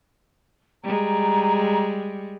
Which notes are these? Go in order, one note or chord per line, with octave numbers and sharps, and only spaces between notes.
G3 G#3 A#5